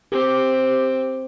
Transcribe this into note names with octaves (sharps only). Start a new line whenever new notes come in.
C4 G4